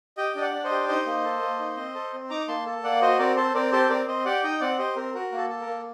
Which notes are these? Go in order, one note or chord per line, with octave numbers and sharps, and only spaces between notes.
G4 D#5 G5
D4 D#5
D5 F#5
D4
C5 D#5
G4
D#4 C5 D#5
A#3
A4
A#3
D#4
C4
A4
C4
D#4 A#5 D6
D6
A#3 A5 C6
A4
A#3 D5 F#5
F#4 C5 D#5
C4 A#4 D5
A4 C5
C4 A#4 D5
G4 A4 C5
C4 A#4 D5
C4 C5 D#5
G4 D5 F#5
D#4 D#5 G5
C4 D5 F#5
G4 C5 D#5
C4 A#4
F#4 A#4
A#3
A4
A4
A#4
A#3